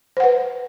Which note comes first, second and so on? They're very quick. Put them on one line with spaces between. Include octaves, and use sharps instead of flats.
C5 F#5 B4